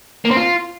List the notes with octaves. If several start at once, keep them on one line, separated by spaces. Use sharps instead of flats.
A#3
C4
F4